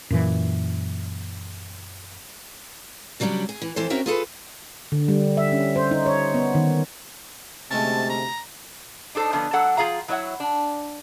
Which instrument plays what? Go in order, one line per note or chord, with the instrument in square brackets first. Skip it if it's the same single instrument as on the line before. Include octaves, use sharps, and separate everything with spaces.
[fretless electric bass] F#2 A#2 E3
[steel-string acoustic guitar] C#3 F#3 G3 C#4 D4
G#4
E3
F2 E3 A4 C5
C4 C#4 F#4 A#4 E5 G5
F4 G#4 A4 B4
[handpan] D3
G3
E5
C#4
C5
D#4
C#5
B3
D#3
[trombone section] D2 C3 [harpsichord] G#3 A3 C#4 [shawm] A5
[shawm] A#5
[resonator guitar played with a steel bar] D4 D#4 A4 C5
D3 F3 B3 D4
F#3 D4 A4 F#5
F3 F4 G#4 F5 A#5
F#3 E4 C#5 D#5 E5 F#5
D4